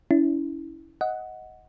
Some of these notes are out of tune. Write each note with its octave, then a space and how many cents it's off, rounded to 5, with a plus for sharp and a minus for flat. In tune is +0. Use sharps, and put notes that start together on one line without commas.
C#4 +35 E4 -10
D#5 +15 F#5 +0